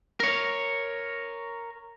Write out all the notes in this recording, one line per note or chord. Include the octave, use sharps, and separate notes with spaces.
A#4 C#5